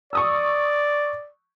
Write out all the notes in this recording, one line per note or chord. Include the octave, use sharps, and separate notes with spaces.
D5 C#6 D#6 E6